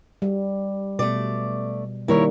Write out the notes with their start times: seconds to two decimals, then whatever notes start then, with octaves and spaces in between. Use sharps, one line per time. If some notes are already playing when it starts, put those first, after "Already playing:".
0.22 G3
0.99 B2 A3 D5
2.08 D#3 G3 A#3 E4 A#4 C#5